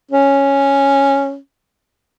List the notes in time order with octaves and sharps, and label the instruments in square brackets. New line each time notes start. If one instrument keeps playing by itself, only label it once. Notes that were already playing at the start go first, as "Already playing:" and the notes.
[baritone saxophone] C#4